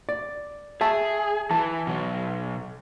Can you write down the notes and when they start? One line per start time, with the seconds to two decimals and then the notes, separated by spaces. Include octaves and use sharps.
0.09 D5
0.81 G#4 E5 A5
1.51 E3 A5
1.87 B2 F#3